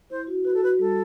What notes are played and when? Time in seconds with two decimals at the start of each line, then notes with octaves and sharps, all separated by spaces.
0.10 E4 C5
0.27 F#4
0.44 F#4 B4
0.54 A4
0.62 F#4 B4
0.79 G3 A4